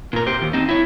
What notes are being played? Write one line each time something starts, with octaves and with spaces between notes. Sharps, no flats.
A#2 A#4
G4 C5
D#2
C4 D#4
E4 C#5